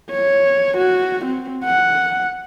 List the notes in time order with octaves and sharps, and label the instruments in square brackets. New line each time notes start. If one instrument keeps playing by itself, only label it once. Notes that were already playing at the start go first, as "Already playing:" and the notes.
[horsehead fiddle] C#5
F#4
C4
F#5